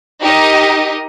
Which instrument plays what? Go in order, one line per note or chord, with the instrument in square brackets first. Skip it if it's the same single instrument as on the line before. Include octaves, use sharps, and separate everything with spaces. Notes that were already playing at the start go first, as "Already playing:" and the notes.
[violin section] D#4 G4 A#4 D#5